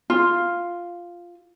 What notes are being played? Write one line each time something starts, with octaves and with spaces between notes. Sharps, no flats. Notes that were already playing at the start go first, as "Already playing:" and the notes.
F4